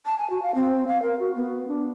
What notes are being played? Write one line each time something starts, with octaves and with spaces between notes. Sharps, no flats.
A5
G#5
F#4
F5
C4
F5
A#4
F#4
B3
D4